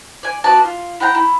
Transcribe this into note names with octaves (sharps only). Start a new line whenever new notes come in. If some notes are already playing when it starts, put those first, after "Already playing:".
D5 G#5
B3 F#4 D5 A5
F4
E4 F#5 G5 A#5
E4